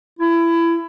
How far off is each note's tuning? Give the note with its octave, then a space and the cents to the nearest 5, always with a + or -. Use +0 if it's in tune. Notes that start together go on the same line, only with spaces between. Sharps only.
E4 +25